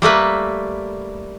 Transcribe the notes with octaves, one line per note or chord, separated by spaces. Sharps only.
G3 A3 A#3 B4